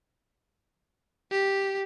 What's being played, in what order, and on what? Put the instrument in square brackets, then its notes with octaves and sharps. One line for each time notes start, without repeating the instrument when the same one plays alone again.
[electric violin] G4